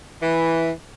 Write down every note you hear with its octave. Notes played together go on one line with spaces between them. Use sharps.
E3